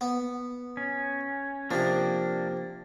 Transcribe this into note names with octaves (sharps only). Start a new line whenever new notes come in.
B3
C#4
C3 F3 A#3 D4